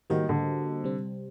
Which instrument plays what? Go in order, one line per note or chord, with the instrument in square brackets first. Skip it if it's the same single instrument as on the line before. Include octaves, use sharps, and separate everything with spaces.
[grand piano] D#3 [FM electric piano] G3 A#3 F#4 C5 D#5
[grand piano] D3
[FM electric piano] C3 G3 C4